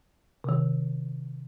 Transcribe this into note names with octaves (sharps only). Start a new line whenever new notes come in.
C3 D#3